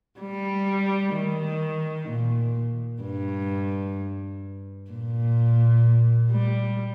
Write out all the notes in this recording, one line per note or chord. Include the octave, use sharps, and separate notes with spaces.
G3
D#3
A#2
G2
A#2
G3